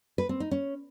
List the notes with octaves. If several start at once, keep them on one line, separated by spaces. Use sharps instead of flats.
B4
C4
D#4
C#4